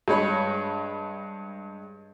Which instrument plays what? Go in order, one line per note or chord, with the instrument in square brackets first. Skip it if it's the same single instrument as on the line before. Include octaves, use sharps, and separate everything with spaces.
[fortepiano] G2 G#3 C#5 B5